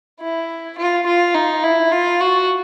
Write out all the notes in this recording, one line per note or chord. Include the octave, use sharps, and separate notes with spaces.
E4
F4
F4
D#4
E4
F4
F#4